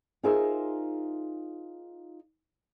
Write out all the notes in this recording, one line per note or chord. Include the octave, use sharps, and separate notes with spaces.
D#4 F4 G#4 A#4 C5 E5